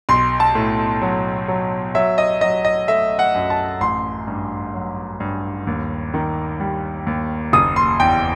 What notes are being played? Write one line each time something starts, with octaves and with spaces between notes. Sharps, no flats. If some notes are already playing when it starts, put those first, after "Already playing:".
B1 C6
A5
A2
F#3
F#3
F#3 E5
D#5
F#3 D#5
D#5
A3 E5
F#5
F#2
A5
A1 C6
G2
F#3
G2
D#2
D#3
G3
D#2
F#1 D#6
C6
E2 G5